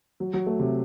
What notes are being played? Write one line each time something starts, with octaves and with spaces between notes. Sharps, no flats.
F#3
F#3
A3
C3